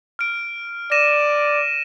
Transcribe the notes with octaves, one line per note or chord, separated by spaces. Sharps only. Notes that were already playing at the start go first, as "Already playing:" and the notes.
F6 D7
D5 A#6 D#7 E7